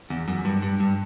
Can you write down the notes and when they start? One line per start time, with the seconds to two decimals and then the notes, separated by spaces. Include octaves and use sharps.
0.10 E2
0.28 F#2
0.45 G2
0.62 G2
0.80 G2